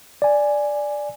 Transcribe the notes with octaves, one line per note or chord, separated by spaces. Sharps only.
D5 G#5